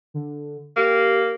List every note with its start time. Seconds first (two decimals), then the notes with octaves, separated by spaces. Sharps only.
0.14 D3
0.77 A#3 G4